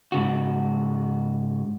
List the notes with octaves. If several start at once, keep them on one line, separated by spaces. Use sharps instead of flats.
G#2 C#3 F#4